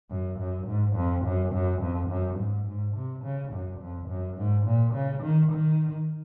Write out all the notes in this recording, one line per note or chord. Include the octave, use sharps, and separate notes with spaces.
F#2
F#2
G#2
F2
F#2
F#2
F2
F#2
G#2
G#2
C3
C#3
F#2
F2
F#2
G#2
A#2
C#3
D#3
D#3